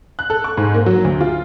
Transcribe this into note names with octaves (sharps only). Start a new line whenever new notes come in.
F#6
A4
C#6
G#2
A#3
F#3
D2
F4